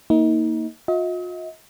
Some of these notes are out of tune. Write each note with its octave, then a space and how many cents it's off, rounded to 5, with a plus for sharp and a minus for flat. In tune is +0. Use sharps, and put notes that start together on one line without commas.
A#3 -10 D#4 +30
F4 +45 D#5 +40